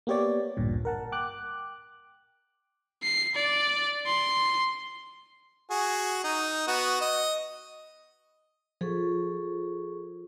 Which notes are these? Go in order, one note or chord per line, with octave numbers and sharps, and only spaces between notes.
A#3 B3 G4 C#5 D5
A1 D2 G2 A#2
A#4 F#5 A5
G5 D6 F#6
C7
D5
C6
F#4 G#4
D#4
B3 F#4
D#5
F3 G#4 A4 C#6